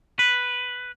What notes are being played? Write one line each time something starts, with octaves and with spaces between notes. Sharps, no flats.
B4